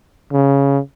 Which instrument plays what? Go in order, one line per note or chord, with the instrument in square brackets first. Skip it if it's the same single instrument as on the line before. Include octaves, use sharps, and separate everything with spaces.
[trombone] C#3